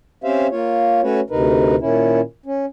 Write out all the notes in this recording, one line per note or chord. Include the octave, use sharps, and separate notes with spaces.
C4 C#4 G4 C5 E5 F5
A#3 F4 C#5
A3 C#4 F#4 B4 C#5
D2 C3 D#4 A#4 B4
A#2 D#3 C#4 E4
C#4